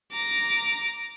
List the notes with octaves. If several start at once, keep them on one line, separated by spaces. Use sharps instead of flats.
A#5 D6